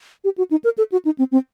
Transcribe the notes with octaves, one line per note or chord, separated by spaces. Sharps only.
G4
F#4
D#4
A#4
A4
F#4
D#4
C4
C4